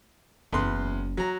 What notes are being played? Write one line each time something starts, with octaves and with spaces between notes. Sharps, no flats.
F#1 E2 B4 C6
E2 F#3 A#5